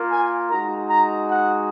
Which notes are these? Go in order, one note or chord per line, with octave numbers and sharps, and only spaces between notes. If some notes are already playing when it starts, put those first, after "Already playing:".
Already playing: A#3 F4
G#5
G#3 D#4 F#4 A#5
A#5
F#5